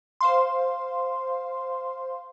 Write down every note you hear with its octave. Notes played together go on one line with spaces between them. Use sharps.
C5 F5 C6